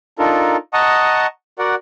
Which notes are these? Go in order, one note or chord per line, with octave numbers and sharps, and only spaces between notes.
D4 D#4 F4 A4 A#4
D#5 F#5 A5 A#5 C#6 D#6
F#4 A#4 D5 F#5